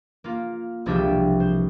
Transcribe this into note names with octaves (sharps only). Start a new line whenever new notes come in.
A#3 F4
E1 C2 F3 D4 G4 E5
C5